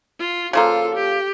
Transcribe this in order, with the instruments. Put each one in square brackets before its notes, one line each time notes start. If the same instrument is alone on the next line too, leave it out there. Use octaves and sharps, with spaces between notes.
[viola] F4
[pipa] C#3 F3 A#3 [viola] F4 A4
[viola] G4